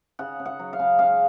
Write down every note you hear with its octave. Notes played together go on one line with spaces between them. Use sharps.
C#3 F#5
C#3
F#5
F#3
F5
C#3
C#3 F5